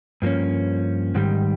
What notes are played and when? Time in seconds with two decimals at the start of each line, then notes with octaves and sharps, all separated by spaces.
0.22 G2 F3 A#3 C#4
1.15 G#2 D#3 G3